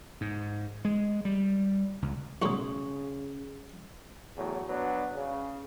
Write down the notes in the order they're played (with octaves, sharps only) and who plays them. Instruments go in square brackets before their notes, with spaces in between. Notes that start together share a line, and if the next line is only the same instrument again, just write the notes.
[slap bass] G#2
G#3
G3
C#2
[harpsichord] B1 A2 G#3 [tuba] C#3 [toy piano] C#6 D#6
[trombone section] E2 A2 F#3
F#3 B3 D4
C#3